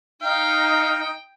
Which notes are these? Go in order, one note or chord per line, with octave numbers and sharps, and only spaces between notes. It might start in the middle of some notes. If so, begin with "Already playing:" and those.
D#4 F5 G5